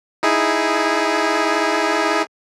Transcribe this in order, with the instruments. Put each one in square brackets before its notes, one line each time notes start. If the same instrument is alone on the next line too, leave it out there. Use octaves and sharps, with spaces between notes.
[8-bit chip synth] D#4 E4 G#4